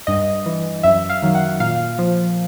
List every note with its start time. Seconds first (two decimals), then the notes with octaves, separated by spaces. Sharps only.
0.07 G2 D#5
0.46 E3
0.83 F#2 E5
1.09 F5
1.22 D#3 F#3
1.35 F#5
1.60 A#2 F5
1.99 F3